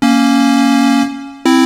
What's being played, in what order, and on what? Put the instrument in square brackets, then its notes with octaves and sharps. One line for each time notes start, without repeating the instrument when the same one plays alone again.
[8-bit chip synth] A#3 C#4
C4 E4